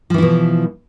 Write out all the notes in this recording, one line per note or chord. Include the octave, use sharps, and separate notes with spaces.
B2 E3 F3 E4